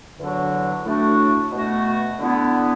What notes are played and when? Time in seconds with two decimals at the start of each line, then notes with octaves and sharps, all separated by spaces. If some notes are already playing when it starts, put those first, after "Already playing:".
0.19 E2 D3 F#3 D4 F#4
0.85 A2 A3 D4 F#4
1.52 B2 A3 F#4
2.18 D3 B3 E4